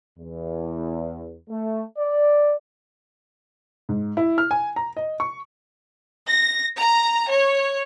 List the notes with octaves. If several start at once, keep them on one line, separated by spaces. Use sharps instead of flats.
E2
A3
D5
G#2
E4
F6
G#5
A#5
D#5
C#6
A#6
A#5
C#5